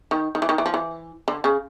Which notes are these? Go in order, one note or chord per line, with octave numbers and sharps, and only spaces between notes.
D#3
D#3
E3
D#3
E3
F3
E3
D3
C#3